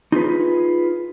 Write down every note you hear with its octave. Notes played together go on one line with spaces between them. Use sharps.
D#4 F4 G#4 B4